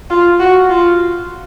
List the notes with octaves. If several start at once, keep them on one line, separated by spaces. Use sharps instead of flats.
F4
F#4
F4